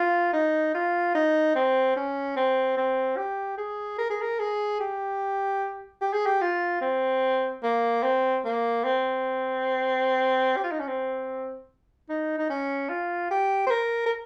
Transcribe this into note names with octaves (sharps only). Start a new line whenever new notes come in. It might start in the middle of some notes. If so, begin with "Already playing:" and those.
Already playing: F4
D#4
F4
D#4
C4
C#4
C4
C4
G4
G#4
A#4
G#4
A#4
G#4
G4
G4
G#4
G4
F4
C4
A#3
C4
A#3
C4
G4
F4
D#4
C#4
C4
D#4
D#4
C#4
F4
G4
C5
A#4
A#4